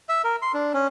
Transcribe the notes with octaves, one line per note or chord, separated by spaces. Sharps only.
E5
A#4
C6
D4
C#4